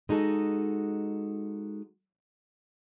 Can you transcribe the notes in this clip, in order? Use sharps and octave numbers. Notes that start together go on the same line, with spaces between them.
G#3 D#4 F#4 A4